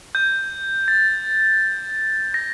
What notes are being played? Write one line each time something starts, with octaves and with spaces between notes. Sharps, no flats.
G6
A6
A#6